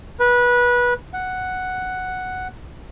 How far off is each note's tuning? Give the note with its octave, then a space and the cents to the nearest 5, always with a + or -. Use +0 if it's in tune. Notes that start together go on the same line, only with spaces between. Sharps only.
B4 -20
F#5 +0